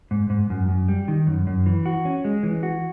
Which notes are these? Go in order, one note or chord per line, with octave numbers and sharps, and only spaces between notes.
G#2
G#2
F#2
F#2
G3
D#3
F#2
F#2
E3
F#4
C#4
G#3
E3
F#4